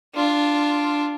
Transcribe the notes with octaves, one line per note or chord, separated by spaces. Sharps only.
D4 F4